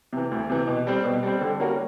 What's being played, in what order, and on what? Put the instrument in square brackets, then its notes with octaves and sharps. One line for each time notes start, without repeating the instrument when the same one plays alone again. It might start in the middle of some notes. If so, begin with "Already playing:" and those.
[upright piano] C3 E3
D2
C3 E3
B2
G3 C4
B2
G3 C4
D3
G3 A#3 C#4 F#4